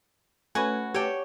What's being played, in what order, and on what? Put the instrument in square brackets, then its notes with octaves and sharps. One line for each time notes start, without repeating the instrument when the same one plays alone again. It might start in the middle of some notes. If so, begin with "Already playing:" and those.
[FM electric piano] A3 C#4 B4 [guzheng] F#4 [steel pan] G#5
[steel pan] G4 A5 [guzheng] C#5 G5